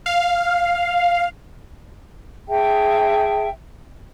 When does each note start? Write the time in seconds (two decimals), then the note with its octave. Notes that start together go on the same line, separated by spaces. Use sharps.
0.06 F5
2.47 G#4 E5 G5 A5